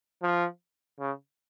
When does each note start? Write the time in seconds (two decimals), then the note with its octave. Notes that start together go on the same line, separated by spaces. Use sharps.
0.22 F3
0.99 C#3